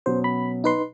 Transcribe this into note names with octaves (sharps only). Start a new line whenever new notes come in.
B2 F#3 C#4 C5
B5
D#4 B4 C6